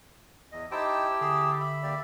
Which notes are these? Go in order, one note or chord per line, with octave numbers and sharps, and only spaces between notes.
E2 D#5
D#4 E4 G4 C5 G5 A5 E6
D3 G#4
E5 B5
A#3 G4 D5